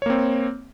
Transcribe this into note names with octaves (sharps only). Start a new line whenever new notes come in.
A#3 C4 C#5